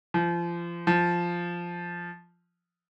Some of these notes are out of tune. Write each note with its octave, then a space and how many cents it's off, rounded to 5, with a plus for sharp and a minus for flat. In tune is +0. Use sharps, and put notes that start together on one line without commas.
F3 -30
F3 -5